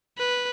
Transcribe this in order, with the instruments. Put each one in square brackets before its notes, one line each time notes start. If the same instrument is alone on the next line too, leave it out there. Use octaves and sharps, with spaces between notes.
[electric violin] B4